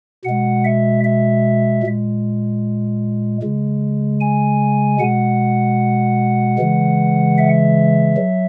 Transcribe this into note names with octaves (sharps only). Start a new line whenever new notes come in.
B2 G#3 F#5
E5
E5
A#2 G#3
C#3 G#3
G#5
B2 G#3 F#5
C#3 E3 G#3
E5
F#3